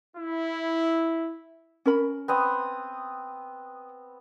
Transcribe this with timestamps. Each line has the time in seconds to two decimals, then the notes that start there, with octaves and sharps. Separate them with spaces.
0.17 E4
1.86 C#4 A#4 B5
2.28 B3 C4 D#6